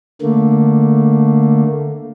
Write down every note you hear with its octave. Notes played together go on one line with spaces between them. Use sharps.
D3 A3 A#3